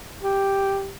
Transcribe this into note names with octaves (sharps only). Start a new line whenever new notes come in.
G4